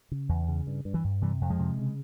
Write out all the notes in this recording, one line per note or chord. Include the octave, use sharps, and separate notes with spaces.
C#3
E2
C#3
G2
G2
E3
G2
C3 E3 G3
F2
F3 G#3
C3
C#3